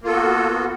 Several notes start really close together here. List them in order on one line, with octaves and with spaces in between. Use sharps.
A#3 F4 A4 B3 F#4